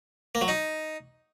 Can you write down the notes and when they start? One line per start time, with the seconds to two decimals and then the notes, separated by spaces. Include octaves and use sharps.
0.35 A#3
0.41 F#3
0.48 D#4